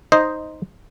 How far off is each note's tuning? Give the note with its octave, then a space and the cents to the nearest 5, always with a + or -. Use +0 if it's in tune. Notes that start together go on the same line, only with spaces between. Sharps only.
D#4 +5 C5 +0 D#5 +0